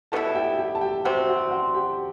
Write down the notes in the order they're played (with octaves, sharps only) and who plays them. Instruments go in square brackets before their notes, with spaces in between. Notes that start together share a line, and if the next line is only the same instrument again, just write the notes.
[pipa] B2 G3 B3 E4 [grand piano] A4 A5
[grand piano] G4 G5
G4 G5
A5
G4 G5
[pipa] C3 G3 C4 [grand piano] F#4 F#5
[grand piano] F#4 F#5
F#4 F#5
G4 G5